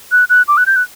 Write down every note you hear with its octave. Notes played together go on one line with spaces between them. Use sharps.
F#6
F#6
D6
F#6
G6
F#6